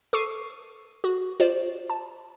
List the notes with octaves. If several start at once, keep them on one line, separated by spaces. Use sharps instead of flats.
A4 C#6 D6 C7 D#7
F#4
F4 C5 D5
A5